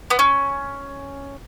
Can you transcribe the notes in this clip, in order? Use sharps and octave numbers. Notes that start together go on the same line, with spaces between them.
B3
C#4